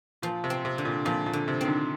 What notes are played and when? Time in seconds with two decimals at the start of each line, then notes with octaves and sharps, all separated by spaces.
0.22 A#2 F3
0.44 C3
0.50 C4
0.65 C3
0.78 D3
0.85 A#2
1.05 A#2 F3
1.26 A#2
1.33 D3
1.48 C3
1.61 D#3 C4
1.68 D3